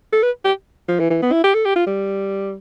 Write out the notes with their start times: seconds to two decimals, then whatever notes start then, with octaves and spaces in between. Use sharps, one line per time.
0.13 A4
0.23 B4
0.45 G4
0.89 F3
1.00 E3
1.10 E3
1.22 B3
1.32 E4
1.44 G4
1.54 A4
1.65 G4
1.76 F4
1.87 G3